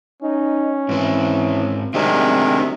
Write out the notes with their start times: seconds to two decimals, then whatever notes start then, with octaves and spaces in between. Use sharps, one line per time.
0.22 C#4 D#4
0.89 G#2 E3 C4
1.94 C3 D#3 G#3 C4 D4 E4 F#4 E5